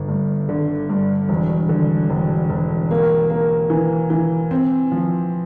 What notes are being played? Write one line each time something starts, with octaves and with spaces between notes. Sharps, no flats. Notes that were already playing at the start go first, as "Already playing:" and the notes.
Already playing: G1
G2
D3
G2
E1
D3
E1
E1
A#3
A#3
E3
E3
C4
F3